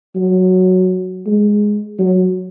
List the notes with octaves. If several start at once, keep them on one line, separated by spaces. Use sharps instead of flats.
F#3
G#3
F#3